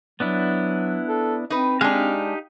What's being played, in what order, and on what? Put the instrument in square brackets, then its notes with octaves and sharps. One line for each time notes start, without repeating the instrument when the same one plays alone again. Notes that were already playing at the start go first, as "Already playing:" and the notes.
[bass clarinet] F#3 [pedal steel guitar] B3 D4 E4
[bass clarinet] A4
[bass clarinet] C4 [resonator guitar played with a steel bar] D#4 B4
[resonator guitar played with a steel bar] G#3 D4 [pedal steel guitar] D#4 G4 F5